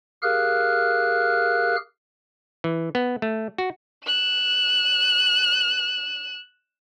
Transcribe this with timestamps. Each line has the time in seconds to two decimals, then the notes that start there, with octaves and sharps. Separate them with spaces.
0.22 G4 G#4 A#4 F5 F6 F#6
2.64 E3
2.95 B3
3.22 A3
3.58 F#4
4.06 F#6 E7